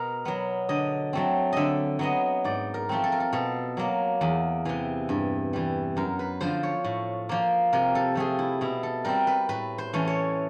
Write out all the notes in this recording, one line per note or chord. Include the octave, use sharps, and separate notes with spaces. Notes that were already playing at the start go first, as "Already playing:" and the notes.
Already playing: B2 A#4
F#3 B3
D3 D#5
F#3 A3 C4
D3 D#5 E5
F#3 B3 D#5
G#2 D5
A#4
F3 A3 C4
A4
A#4
A4
B2 A4
F#3 A#3
E2
C3 E3
G2
E3 G3
F#2 A#4
B4
D3 F3 C5
C#5
A2
F3 A#3
C3 A#4
A4
F3 A3 C4 G#4
E4
B2 E4
A4
G3 C4 A#4
B4
A2 B4
C5
E3 A3 C#4
C#5